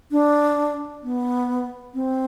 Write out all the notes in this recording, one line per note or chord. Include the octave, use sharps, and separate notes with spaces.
D4
B3
C4